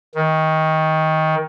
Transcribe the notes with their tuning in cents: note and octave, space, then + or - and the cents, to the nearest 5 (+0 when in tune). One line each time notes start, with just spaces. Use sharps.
D#3 +20